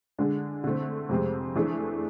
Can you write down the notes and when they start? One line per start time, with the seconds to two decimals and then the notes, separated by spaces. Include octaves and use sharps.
0.18 D3 G#3 D4
0.64 D3 A3 C4
1.09 F2 C3 G#3 C4
1.55 E3 A3 D4 G#4